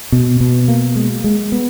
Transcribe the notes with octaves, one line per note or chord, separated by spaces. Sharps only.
B2
B2
A#3
G#3
G#3
B3